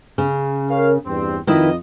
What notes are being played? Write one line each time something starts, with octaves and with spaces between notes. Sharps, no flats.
C#3
A#4 C#5 F5
E2 G2 C4
F2 D#3 E4 F4 B4 D#5